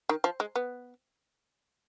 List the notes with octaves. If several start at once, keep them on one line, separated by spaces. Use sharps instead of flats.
D#3
F3
G#3
B3